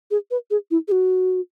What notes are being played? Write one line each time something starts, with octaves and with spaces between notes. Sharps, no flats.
G#4
B4
G#4
E4
G#4
F#4